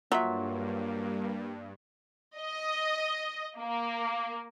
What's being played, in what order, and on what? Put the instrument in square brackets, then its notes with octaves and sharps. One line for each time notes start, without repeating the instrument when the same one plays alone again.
[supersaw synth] G2 [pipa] F#3 [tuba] A#3 [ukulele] F4 E5
[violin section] D#5
A#3